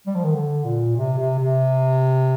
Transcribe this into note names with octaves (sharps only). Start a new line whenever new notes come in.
G3
F3
D#3
D3
A#2
C3
C3
C3